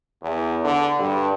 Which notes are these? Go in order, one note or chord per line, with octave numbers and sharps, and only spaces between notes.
E2
D3
G2